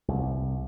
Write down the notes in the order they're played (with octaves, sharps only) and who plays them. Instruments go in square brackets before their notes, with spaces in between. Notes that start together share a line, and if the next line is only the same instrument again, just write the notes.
[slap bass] C2